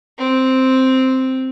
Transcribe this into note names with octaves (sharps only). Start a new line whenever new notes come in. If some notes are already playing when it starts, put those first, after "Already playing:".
C4